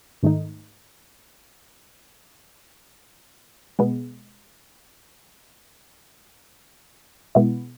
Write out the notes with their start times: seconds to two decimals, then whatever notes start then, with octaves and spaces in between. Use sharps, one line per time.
0.23 G#2 D#3 A3 D#4
3.79 B2 G#3 B3
7.35 B2 G#3 B3 E4